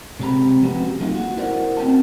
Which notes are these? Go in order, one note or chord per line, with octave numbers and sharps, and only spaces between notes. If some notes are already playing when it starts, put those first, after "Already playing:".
C3 G#3 C4 G4 A#5 B5
F3 G#3 B3 C#4 F#4 G4
F#3 G#3 A#3 D#4 F4
F#4
E4 F#4 A#4 C5 D5 F#5
C4 C#4 F#4 G5 A5